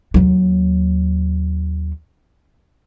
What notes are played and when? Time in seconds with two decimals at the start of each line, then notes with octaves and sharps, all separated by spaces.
0.14 D#2 F#3